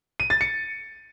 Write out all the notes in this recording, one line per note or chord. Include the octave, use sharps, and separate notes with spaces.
D#7
A6
C#7